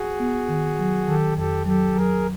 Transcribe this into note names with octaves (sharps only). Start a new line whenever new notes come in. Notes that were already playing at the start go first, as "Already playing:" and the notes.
Already playing: F#4 G#4
B3
D#3
F#3
D#3 G4 A4
F2 G4 A4
F#3 G4 A4
F#3 G#4 A#4